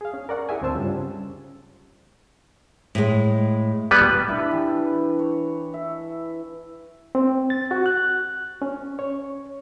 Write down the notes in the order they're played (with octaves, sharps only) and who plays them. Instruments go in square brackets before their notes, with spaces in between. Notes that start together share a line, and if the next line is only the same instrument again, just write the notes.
[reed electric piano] G#4 F5
C#4
A#4 D5 F#5 C#6
E4 G#4 E5 G#5
D2 G#2 C4 C5 A5 E6
G2 C#3 G3 C#4 D4 F4
[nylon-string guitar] A2 G#3
[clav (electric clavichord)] G3 B3 B4
[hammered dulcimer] D4 E4 G4
E3
C#5
E5
[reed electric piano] C4
A6
F#4
F#6
C#4
C#5